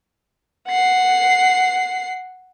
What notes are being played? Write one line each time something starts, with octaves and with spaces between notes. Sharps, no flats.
F#5 C7